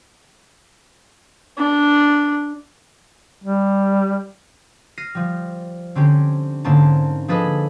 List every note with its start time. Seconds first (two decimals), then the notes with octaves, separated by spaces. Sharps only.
1.58 D4
3.44 G3
4.98 F6 A#6 C7 D#7
5.15 F3 G3
5.95 D3 C4 C#4 G4
6.64 G#2 D3 A#3 C4 C#4 A5
7.28 F3 D4 G#4 A4 B4 D#5